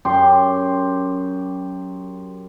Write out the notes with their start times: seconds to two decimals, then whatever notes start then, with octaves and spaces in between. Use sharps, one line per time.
0.05 F#2 G4 C6 D6